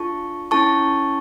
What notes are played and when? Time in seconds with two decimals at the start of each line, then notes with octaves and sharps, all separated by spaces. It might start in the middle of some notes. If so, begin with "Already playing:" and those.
Already playing: D4 F4 A4 A5 C#6
0.51 C#4 E4 A4 A5 C#6